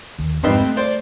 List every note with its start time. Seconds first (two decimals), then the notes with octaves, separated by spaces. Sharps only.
0.19 D#2
0.44 F2 G#2 G3 B3 C4 D#4
0.61 A3
0.77 C5 D5